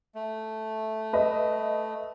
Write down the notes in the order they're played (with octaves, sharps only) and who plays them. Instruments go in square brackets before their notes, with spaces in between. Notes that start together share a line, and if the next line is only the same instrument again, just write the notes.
[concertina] A3
[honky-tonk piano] B4 D#5 E5